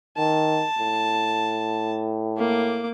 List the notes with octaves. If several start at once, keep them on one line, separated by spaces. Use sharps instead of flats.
D#3 A5
A2
A#3 D6